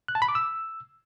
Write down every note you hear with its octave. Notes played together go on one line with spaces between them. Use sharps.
F#6
A5
B5
D6
E6